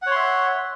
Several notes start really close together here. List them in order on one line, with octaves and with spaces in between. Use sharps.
F#5 C#5 C6 E5